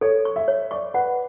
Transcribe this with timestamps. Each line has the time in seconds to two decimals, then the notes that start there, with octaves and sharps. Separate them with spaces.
0.01 A4 C#5
0.25 C#6
0.36 E5
0.48 C#5
0.71 D5 C#6
0.94 B4 F#5